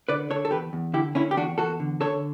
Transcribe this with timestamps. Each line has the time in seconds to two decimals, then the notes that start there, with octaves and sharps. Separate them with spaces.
0.09 D3 B4 D5
0.30 D3 A4 C#5
0.45 A4
0.51 E2 G4 B4
0.73 E2
0.94 D3 E4 G4
1.15 D3 C#4 E4
1.31 G4
1.36 E2 D4 F#4
1.58 E2 F#4 A4
1.80 D3
2.00 D3 A4 C#5